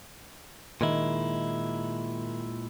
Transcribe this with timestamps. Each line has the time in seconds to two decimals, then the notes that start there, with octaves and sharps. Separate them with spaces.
0.81 A#2 D#3 G#3 E4